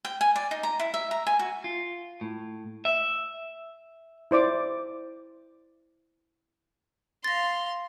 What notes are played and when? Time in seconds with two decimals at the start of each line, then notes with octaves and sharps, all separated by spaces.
0.05 G5
0.21 G#5
0.36 D5
0.51 D#4
0.63 A#5
0.79 E4
0.94 E5
1.11 A#5
1.27 G#5
1.39 F#4
1.64 F4
2.21 A2
2.85 E5
4.31 E4 C5 D5 D6
7.24 F5 C6 A6 A#6